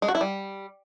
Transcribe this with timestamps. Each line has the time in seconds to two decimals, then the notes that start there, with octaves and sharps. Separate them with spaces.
0.02 G#3
0.08 F#4
0.15 E4
0.21 G3